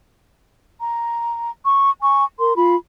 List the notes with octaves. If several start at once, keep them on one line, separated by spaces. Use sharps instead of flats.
A#5
C#6
G#5 C#6
A#4 C6
F4 B5